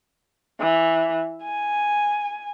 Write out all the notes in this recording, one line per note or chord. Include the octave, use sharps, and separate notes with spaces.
E3
G#5